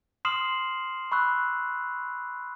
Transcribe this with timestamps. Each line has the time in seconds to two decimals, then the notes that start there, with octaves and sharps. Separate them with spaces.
0.25 C6 D#6 F6 C7 E7 F#7
1.12 B5 C#6 E6 F#6